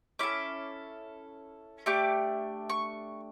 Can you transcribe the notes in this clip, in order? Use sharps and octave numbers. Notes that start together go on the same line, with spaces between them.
C#4 E4 A4 D6
A3 D4 G4 D6
C#6